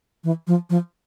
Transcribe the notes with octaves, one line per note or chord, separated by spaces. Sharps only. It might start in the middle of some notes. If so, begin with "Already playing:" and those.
E3
F3
F3